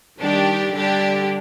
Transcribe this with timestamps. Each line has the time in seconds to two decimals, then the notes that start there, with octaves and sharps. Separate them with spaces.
0.20 D#3 G3 D4 G4
0.74 D3 G3 D4 G4